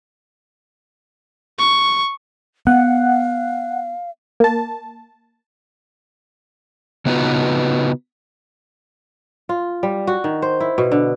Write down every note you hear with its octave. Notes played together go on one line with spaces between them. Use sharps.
C#6
B3 F5 F#5
A#3 A5
C#3 B3 D#4 F4 F#4 B4
F4
G3
F#4
D#3
C5
E4
B2
D3